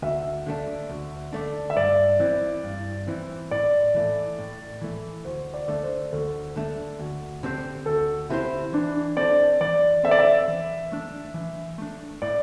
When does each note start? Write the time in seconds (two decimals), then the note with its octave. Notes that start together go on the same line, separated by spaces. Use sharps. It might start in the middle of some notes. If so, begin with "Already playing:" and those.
0.02 D2 E5
0.46 D3 A3 D4
0.89 D2
1.33 D3 A3 D4
1.70 E5
1.76 G2 D5
2.20 E3 C4 E4
2.64 G2
3.07 E3 C4 E4
3.51 A2 D5
3.95 E3 A3
4.39 A2
4.81 E3 A3
5.25 D2 C5
5.54 D5
5.68 D3 A3 D4
5.83 C5
6.12 D2 A4
6.56 D3 A3 D4
6.99 D2
7.43 D3 C4 G4 C5
7.86 D2 A4
8.29 D3 C4 E4 G4 C5
8.73 E3 D4
9.17 C4 A4 C5 D5
9.61 E3 D5
10.03 C4 A4 C5 E5
10.11 D5
10.19 E5
10.48 E3
10.92 A3 D4
11.34 E3
11.78 A3 D4
12.22 A2 D5